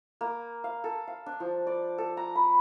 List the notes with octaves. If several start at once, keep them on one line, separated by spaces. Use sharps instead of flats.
A#3
F5
A4
F5
D4
F3
D5
A4
A#5
B5